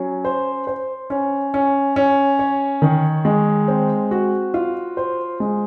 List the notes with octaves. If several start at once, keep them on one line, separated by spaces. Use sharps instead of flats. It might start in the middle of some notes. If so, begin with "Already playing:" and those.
Already playing: F#3 C#4
C5
C5
C#4
C#4
C#4
C#5
D#3
G#3
C4
F#4
F4
C5
G#3